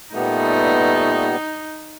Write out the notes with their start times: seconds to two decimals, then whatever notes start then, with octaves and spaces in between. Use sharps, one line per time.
0.14 A#2 G3 A3 B3 D#4